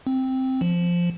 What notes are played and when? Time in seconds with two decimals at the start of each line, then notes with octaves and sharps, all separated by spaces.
0.07 C4
0.61 F3